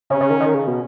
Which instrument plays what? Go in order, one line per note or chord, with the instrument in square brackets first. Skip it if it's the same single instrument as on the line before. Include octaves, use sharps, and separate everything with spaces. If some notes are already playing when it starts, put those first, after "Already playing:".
[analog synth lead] C#3 [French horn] C#4
[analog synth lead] C#3
D#3
D#3
C#3
B2